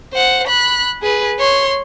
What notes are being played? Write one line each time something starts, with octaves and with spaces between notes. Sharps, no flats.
C5 F#5
B5 F#6
G#4 B4
C#5 C6